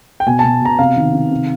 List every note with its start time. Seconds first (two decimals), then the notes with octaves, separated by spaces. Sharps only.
0.20 G5
0.26 B2 G#5
0.39 A5
0.44 B2
0.62 B2 A#5
0.79 C3 F5
0.96 D#3
1.14 D#3
1.31 C3